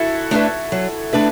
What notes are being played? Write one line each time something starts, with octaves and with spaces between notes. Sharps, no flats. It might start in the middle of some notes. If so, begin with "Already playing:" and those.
Already playing: E4 F#4 A4
A3 D4 B4 E5
F#3
A3 D4 B4 E5